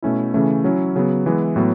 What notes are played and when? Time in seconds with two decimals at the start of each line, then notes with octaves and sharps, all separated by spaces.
0.02 B2 A3 C#4 E4
0.34 C#3 E3 A3 C#4
0.64 F#3 C#4 E4
0.96 C#3 F#3 B3
1.26 E3 G#3 B3 E4
1.56 A2 F#3 B3